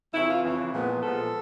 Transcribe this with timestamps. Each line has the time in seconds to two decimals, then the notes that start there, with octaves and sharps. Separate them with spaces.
0.13 F2 C#3 E3 E4
0.29 F4
0.43 F2 C#3 E3
0.72 A#2 F3 G#3 B3
1.01 A#2 F3 G#3 B3 A4